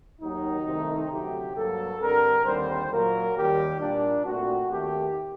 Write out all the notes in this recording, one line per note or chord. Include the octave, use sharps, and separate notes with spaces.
D#2 D#3 F#3 D#4
C2 C3 D#3 A3 C4
D2 C3 F#3 A3 C4 G4
G2 F#3 A#3 A4
G2 D3 G3 C4 A#4
D#2 D3 G3 C4 C5
A#2 F#3 A#3 A#4
D#2 D#3 G3 G4
A#2 G3 A#3 D4
A#2 A3 C4 F#4
D#2 D#3 A3 C4 G4